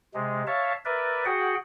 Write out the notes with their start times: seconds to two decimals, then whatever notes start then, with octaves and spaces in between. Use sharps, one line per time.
0.14 C3 G#3
0.47 C#5 E5 F5 A5
0.85 A#4 B4 D5 E5
1.25 F#4 G#4 F#5 G5